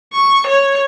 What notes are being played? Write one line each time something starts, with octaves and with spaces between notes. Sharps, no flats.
C#6
C#5